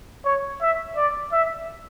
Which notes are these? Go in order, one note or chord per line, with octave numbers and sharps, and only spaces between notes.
C#5
E5
D5
E5